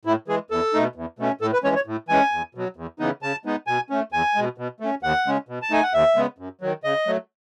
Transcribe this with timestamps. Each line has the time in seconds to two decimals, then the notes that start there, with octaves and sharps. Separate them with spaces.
0.05 A2 E4
0.28 E3 G#3 G#4
0.51 E2 A4
0.74 B2 A3 D#4
0.96 E2
1.19 B2 A3 C#4
1.41 A2 A4
1.53 B4
1.64 E3 G#3 C#4 C#5
1.75 C#5
1.87 A2
2.09 E3 G#3 C#4 G#5
2.32 E2
2.55 B2 F#3
2.77 E2
2.99 C#3 E3 B3 D#4
3.22 C#3 A5
3.45 G#3 B3 D#4
3.67 B2 G#5
3.90 A3 C#4
4.12 E2 G#5
4.35 B2 G#3
4.58 B2
4.80 A3 C#4
5.03 D#2 F#5
5.26 C#3 G#3 C#4
5.49 B2
5.62 A5
5.71 A3 D#4 G#5
5.83 F#5
5.94 D#2 E5
6.16 C#3 G#3 B3
6.39 F#2
6.61 D#3 F#3
6.84 C#3 D#5
7.07 F#3 A3